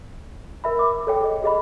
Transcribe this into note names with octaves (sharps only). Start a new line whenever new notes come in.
A#4 E5 B5
D6
A4 C#5 G5
G#4 D#5
G4 G#4 D#5 B5